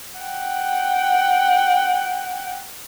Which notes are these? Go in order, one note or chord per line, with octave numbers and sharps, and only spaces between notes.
F#5 G5